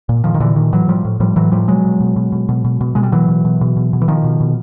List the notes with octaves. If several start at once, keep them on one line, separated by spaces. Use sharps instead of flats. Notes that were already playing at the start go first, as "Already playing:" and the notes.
A#2
A#2 D#3 F3
D#3
A#2 D3 E3
A#2 D#3
A2 E3 F#3
A2 F3 G3
A2
A2 F3 G3
A2 E3 F#3
A2 F3 G3
B2 F#3 G#3
B2
B2
B2
B2
B2
B2
B2
B2 G#3
G3
B2 E3 F#3
B2
B2
B2
B2
B2
E3
B2 D#3 F3
B2
B2